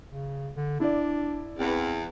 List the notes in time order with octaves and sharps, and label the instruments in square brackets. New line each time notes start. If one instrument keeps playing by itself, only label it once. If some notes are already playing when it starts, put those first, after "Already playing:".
[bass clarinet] C#3
D3
[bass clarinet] D4 [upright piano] E4 D5
[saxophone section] E2 [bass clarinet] C4